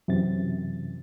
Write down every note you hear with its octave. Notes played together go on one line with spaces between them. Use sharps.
F#2 C3 E3 A6